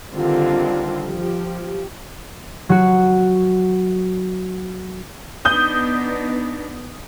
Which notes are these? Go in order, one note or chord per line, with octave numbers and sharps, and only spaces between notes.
D3 D#3 G3 C4 F4
F3 G4
F#3 F#4
B3 D4 D#4 D#6 G6